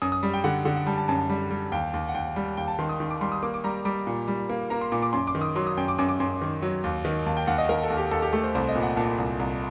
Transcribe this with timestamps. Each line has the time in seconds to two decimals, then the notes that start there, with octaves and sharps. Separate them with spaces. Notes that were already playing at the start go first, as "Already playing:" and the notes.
0.02 F#2 D#6
0.12 D#6
0.23 G3
0.34 G5
0.44 D3 F#5
0.65 D3 F#5
0.76 F#5
0.86 G3 A5
0.97 A5
1.08 F#2 A5
1.19 A5
1.30 G3
1.51 G3
1.72 D#2 G5
1.94 D#2
2.09 F#5
2.15 D#2 G5
2.36 G3
2.57 D#2 G5
2.68 A5
2.79 D#3 C6
2.89 D#6
3.00 D#3
3.10 D6
3.21 G3 C6
3.32 D#6
3.43 A#3 D6
3.54 D6
3.64 G3 A#5
3.85 G3 D6
4.07 A#2
4.28 G3
4.50 A#3
4.70 A#3 A#5
4.81 C6
4.92 A#2 D6
5.02 D6
5.13 F#2 C6
5.27 D6
5.35 D#3
5.41 D#6
5.55 F#3 C6
5.67 D#6
5.77 F#2 G5
5.88 D6
5.99 F#2 D6
6.09 D6
6.20 F#2 C6
6.41 D#3
6.62 F#3
6.84 D#2
7.05 D#3
7.26 D#2 A5
7.37 G5
7.47 D#2 F#5
7.58 D#5
7.69 D#2 A#4
7.83 A4
7.90 D#2
7.97 G4
8.11 D#2 A4
8.22 G4
8.33 A3 A4
8.44 C5
8.55 C2 C5
8.68 D#5
8.75 A#2
8.82 F#5
8.97 A#2 A5
9.18 C2
9.39 C2